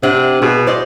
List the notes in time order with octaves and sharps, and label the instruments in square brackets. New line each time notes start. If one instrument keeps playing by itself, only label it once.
[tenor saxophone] C3 [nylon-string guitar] D4 G4 F#5
[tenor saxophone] B2 [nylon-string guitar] G#4
[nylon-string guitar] C5 D5 D#5